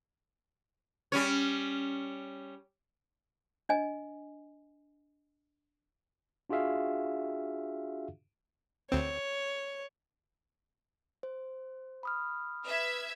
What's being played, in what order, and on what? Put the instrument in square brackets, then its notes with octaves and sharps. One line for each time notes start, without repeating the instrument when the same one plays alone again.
[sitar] G3 C#4 C#5
[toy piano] D4 D#5 G#5
[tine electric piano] D4 F4 F#4 G#4 E5 F5
[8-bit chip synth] D2 C4 [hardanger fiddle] C#5
[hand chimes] C5
B5 D#6 F6
[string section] B4 E5 G#6